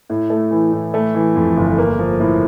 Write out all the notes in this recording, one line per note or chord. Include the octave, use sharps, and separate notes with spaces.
A2
A3
E3
A2
A3
E3
F2
G1
A#3
F3
A2